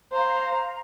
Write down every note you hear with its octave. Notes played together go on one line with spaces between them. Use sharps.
C5 F5 A#5